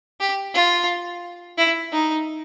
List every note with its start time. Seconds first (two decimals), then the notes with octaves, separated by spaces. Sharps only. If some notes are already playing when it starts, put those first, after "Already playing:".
0.20 G4
0.54 F4
1.58 E4
1.92 D#4